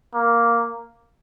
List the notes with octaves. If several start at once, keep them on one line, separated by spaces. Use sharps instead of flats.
A#3